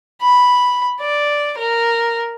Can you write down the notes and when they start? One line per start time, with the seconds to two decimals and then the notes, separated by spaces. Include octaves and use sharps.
0.22 B5
1.01 D5
1.58 A#4